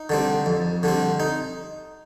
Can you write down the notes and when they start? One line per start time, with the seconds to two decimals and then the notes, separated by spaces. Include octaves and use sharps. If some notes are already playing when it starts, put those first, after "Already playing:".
Already playing: D#4
0.09 D3 G3 C4
0.46 F2
0.83 D3 G3 C4
1.20 D#4